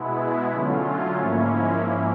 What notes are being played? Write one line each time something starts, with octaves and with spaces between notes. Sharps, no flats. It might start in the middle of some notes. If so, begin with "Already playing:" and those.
Already playing: B2 G#3 B3 E4
D3 F#3 A3 C#4 F4
G#2 F3 A#3 C#4 E4